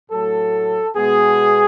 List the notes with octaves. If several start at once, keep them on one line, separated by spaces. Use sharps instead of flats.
A2 F#3 A3 A4
B2 G#3 B3 G#4